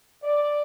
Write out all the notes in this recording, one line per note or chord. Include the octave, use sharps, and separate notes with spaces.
D5